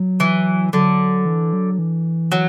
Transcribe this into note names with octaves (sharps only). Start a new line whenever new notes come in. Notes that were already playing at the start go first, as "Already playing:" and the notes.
Already playing: F#3
E3
D3 F#3
E3
F#3
E3
F#3